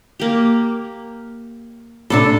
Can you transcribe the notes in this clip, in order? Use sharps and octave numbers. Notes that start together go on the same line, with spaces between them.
A#3 G4
A2 C3 D4 A4